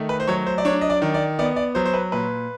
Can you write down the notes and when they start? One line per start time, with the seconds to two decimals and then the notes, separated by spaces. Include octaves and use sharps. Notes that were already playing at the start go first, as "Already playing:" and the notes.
Already playing: D#3 A3
0.09 B4
0.20 C5
0.28 F#3 C#5
0.47 C5
0.58 D5
0.65 D4 C#5
0.81 D#5
0.90 D5
1.02 D#3
1.14 D5
1.39 B3 D5
1.56 D5
1.75 F#3 C5
1.85 C5
1.94 B4
2.12 A#2 B4